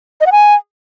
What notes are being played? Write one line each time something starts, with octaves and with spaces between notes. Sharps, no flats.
D#5
F#5
G#5